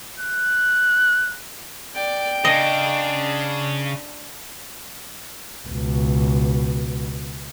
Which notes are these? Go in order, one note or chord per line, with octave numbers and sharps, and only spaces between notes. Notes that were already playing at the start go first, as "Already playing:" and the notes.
F#6
D5 G5
C#3 D4 D#5
C#2 B2